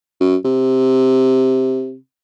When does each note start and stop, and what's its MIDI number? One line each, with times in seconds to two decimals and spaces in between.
0.20 0.36 42
0.45 1.95 48